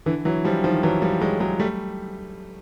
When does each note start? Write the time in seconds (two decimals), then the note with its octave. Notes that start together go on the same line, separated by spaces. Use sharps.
0.06 D3 E3
0.25 E3 F#3
0.44 F3 G3
0.64 D#3 F3
0.83 E3 F#3
1.02 F3 G3
1.21 F#3 G#3
1.40 F#3 G#3
1.60 G3 A3